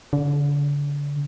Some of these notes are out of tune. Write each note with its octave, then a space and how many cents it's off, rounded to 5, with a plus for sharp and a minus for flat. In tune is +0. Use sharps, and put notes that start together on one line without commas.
D3 -35